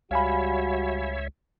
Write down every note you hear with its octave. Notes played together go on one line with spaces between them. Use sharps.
C#2 G3 F#4 C#5 E5 F5 G#5 B5